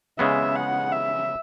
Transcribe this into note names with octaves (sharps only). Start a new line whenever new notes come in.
C#3 G#3 B3 E5
F#5
E5